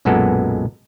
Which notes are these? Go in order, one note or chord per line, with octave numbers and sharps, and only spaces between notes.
B1 F#2 A#2 G#3 B3 A4